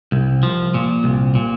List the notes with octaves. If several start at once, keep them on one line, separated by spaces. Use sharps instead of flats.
C2
F3
A#2
C2
A#2